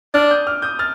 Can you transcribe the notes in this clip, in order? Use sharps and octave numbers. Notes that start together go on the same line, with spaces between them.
D4 F6 A6
D#6 G6
D6 F6
D#6 G6
F6 A6